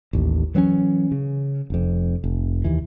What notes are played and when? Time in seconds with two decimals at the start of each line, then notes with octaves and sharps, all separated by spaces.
0.13 A1 D#2
0.55 E3 F#3 B3 C#4
1.11 C#3
1.70 F1 F2
2.24 F1
2.65 D#2 E3